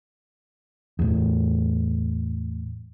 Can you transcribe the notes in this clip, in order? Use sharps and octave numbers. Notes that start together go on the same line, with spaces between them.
E2 A2